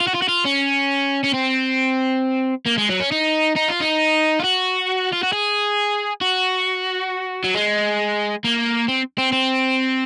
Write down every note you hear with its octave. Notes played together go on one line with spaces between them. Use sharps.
F4
F#4
F4
F#4
F4
C#4
C#4
C4
A#3
G#3
F#3
C#4
D#4
D#4
F4
D#4
F4
F#4
F4
F#4
G#4
F#4
F#3
G#3
A#3
C4
C4
C4